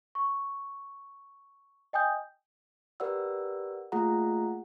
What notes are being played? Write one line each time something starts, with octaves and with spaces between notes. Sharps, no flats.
C#6
D#5 G5 G#5 D#6 G6
G4 A#4 B4 D5 F#5 E6
A3 A#3 F4 G#4 F#5 A#5